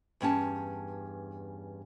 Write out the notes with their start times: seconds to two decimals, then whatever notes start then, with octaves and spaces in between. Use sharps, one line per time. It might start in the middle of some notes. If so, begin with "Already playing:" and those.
0.21 E2 G2 C#4 A5